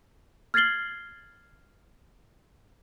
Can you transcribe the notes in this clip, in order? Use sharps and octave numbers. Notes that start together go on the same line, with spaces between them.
F6 G#6 A6 C7 F#7 G7